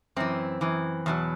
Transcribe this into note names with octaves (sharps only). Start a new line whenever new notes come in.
F#2 E3 C4
F#2 E3
E2 B2 F#3